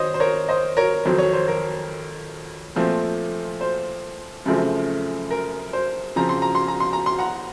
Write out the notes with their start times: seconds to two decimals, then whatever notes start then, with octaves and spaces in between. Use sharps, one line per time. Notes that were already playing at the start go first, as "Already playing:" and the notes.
Already playing: D#3 C5 C#5 D#5
0.14 C5
0.20 A#4 C#5
0.49 C5 D#5
0.77 A#4 C#5
1.05 F2 D#3 F#3 C5
1.18 C#5
1.33 C5
1.48 A#4
2.76 A#2 F3 A3 C4
3.61 C5
4.46 F#2 C#3 F3 A3 C4
5.31 A#4
5.73 C5
6.16 C#3 F3 C4 A#5
6.29 C6
6.42 A#5
6.55 C6
6.68 A#5
6.80 C6
6.93 A#5
7.06 C6
7.19 F#5 A#5